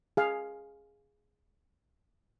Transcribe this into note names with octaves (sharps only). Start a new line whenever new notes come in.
G#4 F5